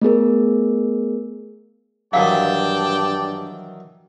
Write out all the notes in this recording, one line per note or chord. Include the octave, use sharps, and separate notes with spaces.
A3 B3 G#4 A#4
G2 D#3 E3 F#3 D5 F5 G5 A5